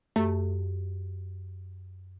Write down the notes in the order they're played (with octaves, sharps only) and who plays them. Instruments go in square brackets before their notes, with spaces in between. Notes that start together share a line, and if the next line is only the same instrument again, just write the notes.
[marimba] F#2 G4 [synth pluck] A3